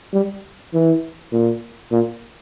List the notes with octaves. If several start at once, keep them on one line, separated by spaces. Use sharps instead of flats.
G3
E3
A#2
A#2